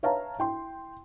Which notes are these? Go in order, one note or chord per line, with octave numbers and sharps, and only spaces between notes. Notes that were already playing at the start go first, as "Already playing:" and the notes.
B4 C#5 E5 F5 A5 A#5
E4 G5 C6